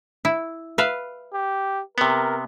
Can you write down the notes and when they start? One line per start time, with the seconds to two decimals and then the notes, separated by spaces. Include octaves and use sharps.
0.25 E4
0.78 B4 E5 F5
1.33 G4
1.98 C3 B3 A#4